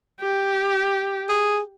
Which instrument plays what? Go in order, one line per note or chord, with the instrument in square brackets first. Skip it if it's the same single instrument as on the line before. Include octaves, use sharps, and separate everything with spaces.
[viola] G4
[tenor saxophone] G#4